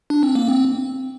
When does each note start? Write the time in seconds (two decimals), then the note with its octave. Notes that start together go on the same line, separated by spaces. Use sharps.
0.10 D4
0.23 C4
0.35 A#3
0.48 C4